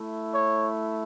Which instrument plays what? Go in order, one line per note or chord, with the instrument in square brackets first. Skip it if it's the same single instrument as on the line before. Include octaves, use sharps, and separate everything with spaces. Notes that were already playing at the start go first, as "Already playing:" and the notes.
Already playing: [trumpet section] A3 E4
C#5